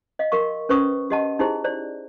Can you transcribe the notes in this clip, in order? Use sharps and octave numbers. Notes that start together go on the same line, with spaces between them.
D#5 F5
F#4 A#4 F5 C#6
C#4 B4 C5 C#6 D#6
F#4 G4 D#5 F#5 A5
D#4 E4 G4 G#4 C5
C5 D5